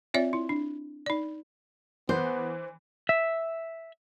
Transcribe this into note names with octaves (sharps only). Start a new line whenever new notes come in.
C4 F4 C#5 D5 E5
E4
D4
D#4 D5
E3 B3 C5
E5